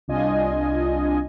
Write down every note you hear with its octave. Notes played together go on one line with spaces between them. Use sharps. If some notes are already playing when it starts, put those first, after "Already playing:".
C2 D4 F4 D#5 G#5